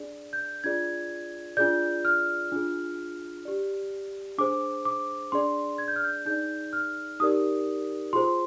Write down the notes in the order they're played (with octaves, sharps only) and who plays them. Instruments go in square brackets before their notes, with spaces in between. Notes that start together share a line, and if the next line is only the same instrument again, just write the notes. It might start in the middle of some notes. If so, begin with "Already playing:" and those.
Already playing: [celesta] D4 G#4 D5
G6
D4 F4 G#4 D5 G#6
D4 F4 G#4 D5 G6
F6
D4 F4 G#4
G4 D5
D4 G#4 C5 D6
D6
D4 G#4 D5 C6
G#6
G6
F6
G6
D#4 G#4 D5 G6
F6
D#4 G4 A#4 D5 D#6
F4 G#4 C5 C6